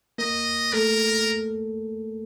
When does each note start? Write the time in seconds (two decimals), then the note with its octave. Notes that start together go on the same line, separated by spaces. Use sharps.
0.18 A#3 A#4 D#5
0.73 A3 A4 A#4